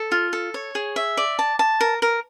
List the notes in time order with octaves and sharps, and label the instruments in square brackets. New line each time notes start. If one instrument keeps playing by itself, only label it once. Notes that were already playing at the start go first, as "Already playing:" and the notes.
Already playing: [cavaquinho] A4
F4
A4
C#5
G#4
E5
D5
A5
A5
A#4
A#4